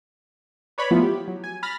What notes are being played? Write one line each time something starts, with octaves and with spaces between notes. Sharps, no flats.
B4 C#5 D5 B5
F3 A3 B3 E4 F4
G4
F#3
G#5
B5 F6 A6 A#6